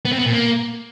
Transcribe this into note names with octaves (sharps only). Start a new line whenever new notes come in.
B3
C4
B3
A#2
A#3